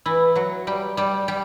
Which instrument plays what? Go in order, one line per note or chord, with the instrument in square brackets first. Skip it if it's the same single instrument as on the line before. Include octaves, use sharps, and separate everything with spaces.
[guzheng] E3 E4
F#3 F#4
G3 G4
G3 G4
G3 G4